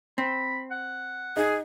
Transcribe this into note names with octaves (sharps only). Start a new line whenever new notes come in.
C4 B5
F#5
D#4 G#4